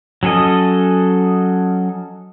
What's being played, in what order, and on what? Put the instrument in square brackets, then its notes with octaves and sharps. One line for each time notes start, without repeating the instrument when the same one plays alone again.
[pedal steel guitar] F#3 C#4 A4 D#5